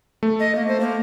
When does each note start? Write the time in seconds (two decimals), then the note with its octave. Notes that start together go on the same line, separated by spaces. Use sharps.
0.23 A3
0.40 D#5
0.55 A#3
0.68 C5
0.80 A#3